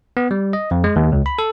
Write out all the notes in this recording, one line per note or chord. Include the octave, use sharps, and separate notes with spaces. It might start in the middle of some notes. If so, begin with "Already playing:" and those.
B3
G3
D#5
F2
G#3
D#2
C#2
B5
A4